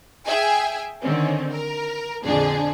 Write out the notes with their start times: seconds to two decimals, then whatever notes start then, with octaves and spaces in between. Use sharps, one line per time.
0.26 G#4 E5 G5 G#5
1.02 D3 D#3 C4 C#4
1.52 A#4
2.25 A#1 F2 D3 D4 G#4